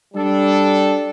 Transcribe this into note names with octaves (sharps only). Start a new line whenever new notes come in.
G3 D4 A4